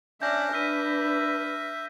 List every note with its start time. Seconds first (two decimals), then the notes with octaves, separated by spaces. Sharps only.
0.22 C#4 D4 D5 E5 G6 A#6
0.53 D4 B4 E5 F6 B6 D#7